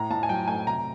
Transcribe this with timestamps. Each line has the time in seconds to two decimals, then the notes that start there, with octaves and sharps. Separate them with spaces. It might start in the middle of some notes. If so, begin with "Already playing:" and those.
Already playing: A2 A#5
0.11 A2 A5
0.23 G#5
0.29 F#3 G5
0.48 A3 G#5
0.67 C3 A#5